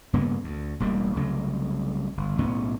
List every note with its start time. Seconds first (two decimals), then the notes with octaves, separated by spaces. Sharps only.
0.13 G2 C#3 A#3 B3
0.44 D2
0.80 E1 A1 G3 A#3
1.16 C2 C#3 F#3 A3
2.17 G1
2.38 B1 A2 B3 C#4